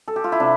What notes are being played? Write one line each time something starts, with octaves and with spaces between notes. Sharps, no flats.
A4
G4
F4
E4
C3 D4